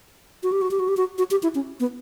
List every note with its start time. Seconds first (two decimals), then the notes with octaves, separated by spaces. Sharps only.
0.43 F#4
0.52 G4
0.62 F#4
0.71 G4
0.79 F#4
0.88 G4
0.97 F#4
1.18 F#4
1.31 G4
1.43 E4
1.55 C#4
1.80 B3